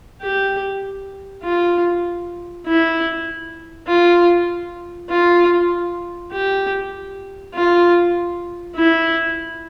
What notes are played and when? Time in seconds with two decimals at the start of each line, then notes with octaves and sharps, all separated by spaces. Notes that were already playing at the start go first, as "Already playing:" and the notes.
0.22 G4
1.43 F4
2.66 E4
3.87 F4
5.10 F4
6.32 G4
7.54 F4
8.76 E4